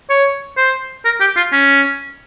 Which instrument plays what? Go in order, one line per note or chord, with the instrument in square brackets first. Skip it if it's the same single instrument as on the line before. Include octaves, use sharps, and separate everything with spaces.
[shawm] C#5
C5
A#4
G4
F4
C#4